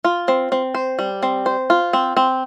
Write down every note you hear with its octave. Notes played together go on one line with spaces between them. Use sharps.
F4
C4
C4
C5
G3
C4
C5
F4
C4
C4